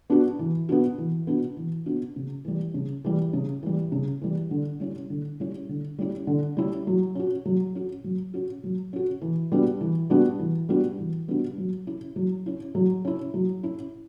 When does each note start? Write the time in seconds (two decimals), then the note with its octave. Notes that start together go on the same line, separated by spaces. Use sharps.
0.10 B3 D4 F#4
0.39 E3
0.69 B3 D4 F#4
0.98 E3
1.27 B3 D4 F#4
1.57 E3
1.86 B3 D4 F#4
2.16 C#3
2.45 E3 G3
2.74 C#3
3.04 E3 G3
3.33 C#3
3.63 E3 G3
3.92 C#3
4.21 E3 G3
4.51 D3
4.80 G3 C#4 E4
5.10 D3
5.40 G3 C#4 E4
5.69 D3
5.99 G3 C#4 E4
6.27 D3
6.57 G3 C#4 E4
6.87 F#3
7.15 C#4 F#4
7.45 F#3
7.75 C#4 F#4
8.04 F#3
8.34 C#4 F#4
8.64 F#3
8.93 C#4 F#4
9.22 E3
9.52 G3 B3 D4 F#4
9.81 E3
10.10 G3 B3 D4 F#4
10.39 E3
10.69 G3 B3 D4 F#4
10.98 E3
11.28 G3 B3 D4 F#4
11.58 F#3
11.87 C#4 E4
12.16 F#3
12.46 C#4 E4
12.75 F#3
13.05 C#4 E4
13.34 F#3
13.63 C#4 E4